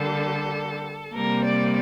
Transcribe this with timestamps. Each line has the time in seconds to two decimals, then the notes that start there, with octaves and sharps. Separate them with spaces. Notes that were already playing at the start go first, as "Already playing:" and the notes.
Already playing: D3 G3 A#3 A4
1.13 C3 G3 A#3 A#4
1.44 D5